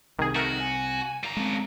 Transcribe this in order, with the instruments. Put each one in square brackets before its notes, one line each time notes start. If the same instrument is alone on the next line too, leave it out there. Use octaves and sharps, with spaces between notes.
[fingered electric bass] C2 C3 [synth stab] D#3 G#4
[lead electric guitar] D#3 [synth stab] A3 A#4 [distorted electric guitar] F#4
[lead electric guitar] G#5
[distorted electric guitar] G3 A#5
[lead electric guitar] C#3 A3 [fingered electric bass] G#3 C4